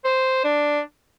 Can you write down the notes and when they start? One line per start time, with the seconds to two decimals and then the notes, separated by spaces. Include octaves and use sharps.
0.05 C5
0.44 D4